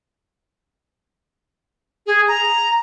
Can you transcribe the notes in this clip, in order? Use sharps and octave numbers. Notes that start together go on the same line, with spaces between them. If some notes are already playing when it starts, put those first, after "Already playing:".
G#4
A#5